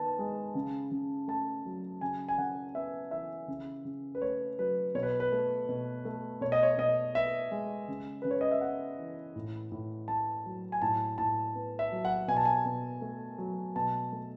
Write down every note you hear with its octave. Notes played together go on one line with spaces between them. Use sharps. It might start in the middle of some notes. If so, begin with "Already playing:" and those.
Already playing: D#3 B3 A5
G#3
C#3
C#3
A3 A5
F#3
C#3 G#5
G#5
C#3 F#5
B3 E5
E3 E5
C#3
C#3
B4
A3 C#5
F#3 B4
B2 C#5
B4
B4
A3
B2
A3
B2 C#5
D#5
C#5
B2 D#5
B3 E5
G#3
C#3
C#3 B4
C#5
D#5
E5
B3 F#5
E3
A2
A2
A3 A5
F#3
G#5
A2 A5
A2 A5
B3
E5
F#3
F#5
B2 G#5
A5
G#5
B2
A3
F#3
B2 A5
A3